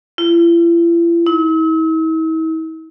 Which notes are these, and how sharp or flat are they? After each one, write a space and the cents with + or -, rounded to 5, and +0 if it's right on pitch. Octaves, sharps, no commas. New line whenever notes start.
E4 +45
E4 -45